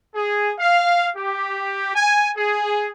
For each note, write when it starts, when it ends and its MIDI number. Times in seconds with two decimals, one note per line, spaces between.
0.15 0.51 68
0.58 1.08 77
1.16 1.94 67
1.95 2.30 80
2.37 2.88 68